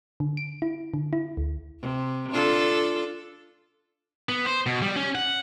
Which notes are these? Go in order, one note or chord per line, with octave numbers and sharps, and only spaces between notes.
D3
D7
E4
D3
E4
D2
C3
D4 F4 A4
B3
C5
B2
G3
C#4
F#5